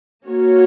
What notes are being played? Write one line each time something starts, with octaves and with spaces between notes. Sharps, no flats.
A#3 C#4 F#4 C#5